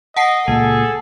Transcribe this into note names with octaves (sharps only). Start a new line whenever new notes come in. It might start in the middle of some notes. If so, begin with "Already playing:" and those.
D#5 F#5 A5 C7
C#2 A#2 G#4 A4